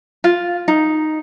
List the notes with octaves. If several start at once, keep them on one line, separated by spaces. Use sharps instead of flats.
F4
D#4